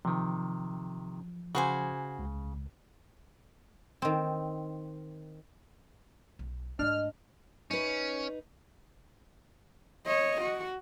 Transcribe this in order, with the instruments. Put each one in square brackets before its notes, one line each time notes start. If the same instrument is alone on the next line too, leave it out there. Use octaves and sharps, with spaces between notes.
[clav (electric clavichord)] C3 D#3 [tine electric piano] F3
[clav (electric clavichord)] C#3 [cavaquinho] F#4 C5 G#5
[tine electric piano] C#2
[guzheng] D#3 C4
[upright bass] B1
[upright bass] G#2 A3 [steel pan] D4 [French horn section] D#5 [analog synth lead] F6
[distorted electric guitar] C#4 [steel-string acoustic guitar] D#4 B4
[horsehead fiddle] C#5 D#5
F#4